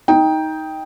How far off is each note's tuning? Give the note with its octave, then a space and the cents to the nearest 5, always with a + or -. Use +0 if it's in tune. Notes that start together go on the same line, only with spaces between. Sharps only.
D#4 +15 G5 +5